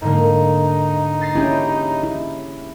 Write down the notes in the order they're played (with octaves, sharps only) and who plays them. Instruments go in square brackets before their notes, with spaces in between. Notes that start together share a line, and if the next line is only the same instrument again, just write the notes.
[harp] G#2 D3 A#3 [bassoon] D#4
[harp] A6 A#6 C7
[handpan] C#4 E4 [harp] G4 G#4
[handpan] E4